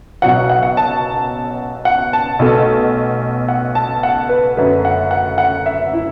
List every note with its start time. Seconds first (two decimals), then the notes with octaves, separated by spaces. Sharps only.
0.22 B1 B2 F#3 F#5
0.36 E5
0.49 F#5
0.63 F#5
0.77 A5
1.85 F#5
2.13 A5
2.39 B1 B2 A3
3.48 F#5
3.75 A5
4.03 F#5
4.29 B4
4.57 F#2 D3 A3 B4
4.85 F#5
5.11 F#5
5.38 F#5
5.66 E5
5.93 E4